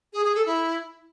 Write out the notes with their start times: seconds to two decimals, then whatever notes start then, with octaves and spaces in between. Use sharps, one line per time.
0.13 G#4
0.24 G#4
0.35 A4
0.46 E4